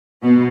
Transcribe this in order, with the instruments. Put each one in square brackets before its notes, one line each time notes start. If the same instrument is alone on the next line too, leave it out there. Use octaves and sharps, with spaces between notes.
[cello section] B2